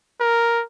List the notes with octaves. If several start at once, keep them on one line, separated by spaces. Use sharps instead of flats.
A#4